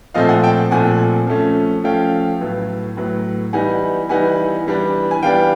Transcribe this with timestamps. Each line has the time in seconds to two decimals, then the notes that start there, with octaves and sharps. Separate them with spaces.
0.14 A#2 F3 A3 C4 D#5 F5
0.29 F#5 G#5
0.43 G5 A5
0.71 A#2 F3 A3 C4 F#5 G#5
1.27 F3 A3 C#4
1.84 F3 A3 C#4 F5 G5
2.40 A2 F#3 B3
2.97 A2 F#3 B3
3.53 E3 G3 B3 D#4 F#5 G#5
4.09 E3 G3 B3 D#4 F#5 G#5
4.67 E3 G3 B3 D4
5.11 G#5
5.23 E3 G3 B3 D4 F5 G5